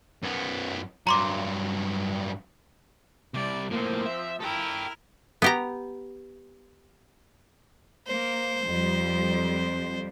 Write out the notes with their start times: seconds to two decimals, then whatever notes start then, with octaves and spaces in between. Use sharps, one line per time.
0.23 F#2 B3
1.07 G2 F#3 A#5 C6 D6
3.34 C3 G3 D5
3.70 A2 F3 A#3 C4
4.06 E5
4.41 E4 A4 A#4 G5
5.42 B3 G4 A#5
8.08 A#3 C5
8.64 F2 G3